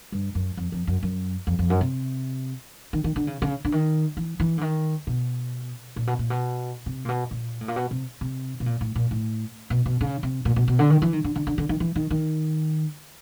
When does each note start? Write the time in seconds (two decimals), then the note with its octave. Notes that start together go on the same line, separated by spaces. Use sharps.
0.12 G2
0.35 F#2
0.57 F2
0.72 F2
0.87 F#2
1.03 F#2
1.47 F2
1.59 F2
1.70 F#2
1.81 C3
2.93 D#3
3.04 D#3
3.16 D3
3.27 C#3
3.42 C#3
3.65 D3
3.72 D#3
4.17 E3
4.40 E3
4.58 D3
4.61 D#3
5.07 B2
5.96 A#2
6.07 B2
6.19 A#2
6.30 B2
6.86 C3
7.05 A#2
7.09 B2
7.31 A#2
7.61 A2
7.68 A#2
7.76 B2
7.91 C3
8.21 C3
8.60 B2
8.66 A#2
8.81 A2
8.96 A#2
9.11 A2
9.70 B2
9.86 B2
10.01 C#3
10.23 C3
10.45 A#2
10.56 B2
10.68 B2
10.79 D3
10.90 D#3
11.02 E3
11.13 D#3
11.24 D3
11.36 D3
11.47 D3
11.58 D3
11.69 D#3
11.80 E3
11.96 D#3
12.10 D#3